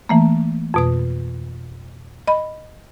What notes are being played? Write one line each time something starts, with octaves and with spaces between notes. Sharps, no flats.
E3 A3 A#3
F2 B2 D#6
D#5 B5